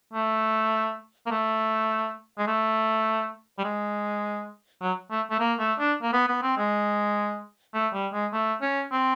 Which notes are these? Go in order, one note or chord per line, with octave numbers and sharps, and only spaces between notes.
A3
A#3
A3
G#3
A3
G3
G#3
F#3
A3
A3
A#3
A3
D4
A#3
B3
B3
C4
G#3
A3
G3
G#3
A3
C#4
C4